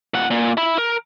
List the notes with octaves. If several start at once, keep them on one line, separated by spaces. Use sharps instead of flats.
A#2 F#5
A#2
E5 B5
A#4